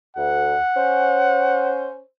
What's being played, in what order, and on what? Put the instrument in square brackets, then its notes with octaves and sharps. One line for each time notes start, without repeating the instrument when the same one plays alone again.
[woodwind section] D2 [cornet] F#5
[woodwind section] C#4 C5